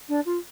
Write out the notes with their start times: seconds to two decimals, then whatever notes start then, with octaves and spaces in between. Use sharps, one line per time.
0.08 D4
0.26 F4